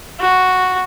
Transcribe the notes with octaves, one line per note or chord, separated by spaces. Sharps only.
F#4